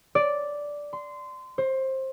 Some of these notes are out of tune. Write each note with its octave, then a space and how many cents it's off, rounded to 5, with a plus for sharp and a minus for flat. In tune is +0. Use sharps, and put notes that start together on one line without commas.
D5 -5
C6 -20
C5 +20